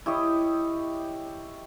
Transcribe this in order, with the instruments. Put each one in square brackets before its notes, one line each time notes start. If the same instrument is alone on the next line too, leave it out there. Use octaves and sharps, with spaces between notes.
[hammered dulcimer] E4 G4 C#5 D#5